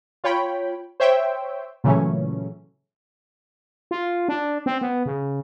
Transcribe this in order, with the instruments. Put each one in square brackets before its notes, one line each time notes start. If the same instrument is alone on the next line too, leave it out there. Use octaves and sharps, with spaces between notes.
[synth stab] F4 C#5 G5 B5
C5 C#5 E5 G5
A#2 C#3 E3 F#3 A3 C#4
[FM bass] F4
D4
C4
B3
C#3